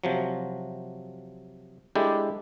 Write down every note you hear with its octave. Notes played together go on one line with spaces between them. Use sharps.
C3 F3 F#3
G#3 D4 E4 G4 A4